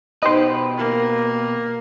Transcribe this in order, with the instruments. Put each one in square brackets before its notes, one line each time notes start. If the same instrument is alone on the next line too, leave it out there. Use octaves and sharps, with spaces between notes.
[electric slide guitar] B2 G4 B4 [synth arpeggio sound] D#4 C5
[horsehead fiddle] A#3